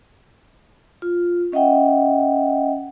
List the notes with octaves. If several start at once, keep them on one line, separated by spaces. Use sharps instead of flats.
F4
C#4 D#5 E5 F#5 G5